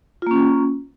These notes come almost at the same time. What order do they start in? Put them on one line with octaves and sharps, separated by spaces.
F4 A#3 C#4